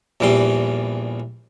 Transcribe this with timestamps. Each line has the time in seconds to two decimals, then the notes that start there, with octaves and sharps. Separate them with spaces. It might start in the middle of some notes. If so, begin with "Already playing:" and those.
0.20 A#1 E2 E3 G3 C6